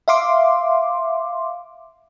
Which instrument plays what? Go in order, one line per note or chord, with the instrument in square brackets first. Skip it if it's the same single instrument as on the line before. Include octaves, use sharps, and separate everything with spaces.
[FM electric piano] E5 F5 C6 D6